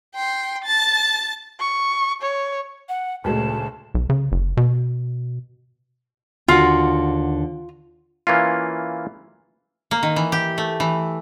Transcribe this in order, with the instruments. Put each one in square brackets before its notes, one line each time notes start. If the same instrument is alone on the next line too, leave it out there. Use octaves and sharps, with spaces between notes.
[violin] G5 C6
A5 A6
[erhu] C#6
C#5
[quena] F#5
[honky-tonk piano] D2 G#3 A3 [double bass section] A#2 C#3 [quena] A5
[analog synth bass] B1
C#3
F#1
B2
[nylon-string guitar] D#2 D3 F#4 [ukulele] F4
[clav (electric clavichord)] E3 A#3 C#4 F4
[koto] A#3
D#3
E3
G4
A3
E3